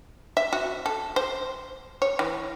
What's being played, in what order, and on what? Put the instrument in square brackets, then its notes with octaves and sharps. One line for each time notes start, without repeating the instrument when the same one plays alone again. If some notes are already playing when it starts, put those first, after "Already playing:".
[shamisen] E5
F#4
A4
C5
C#5
E3